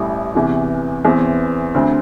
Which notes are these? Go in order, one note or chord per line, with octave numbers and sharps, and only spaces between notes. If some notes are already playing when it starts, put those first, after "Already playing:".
Already playing: A1 A2 G3 E4
E2 C3 E3
E2 E3 C4
D2 D3 C4